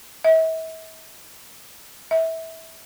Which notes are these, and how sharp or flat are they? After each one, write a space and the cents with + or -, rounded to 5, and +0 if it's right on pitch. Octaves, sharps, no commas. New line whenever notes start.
E5 -40
E5 -20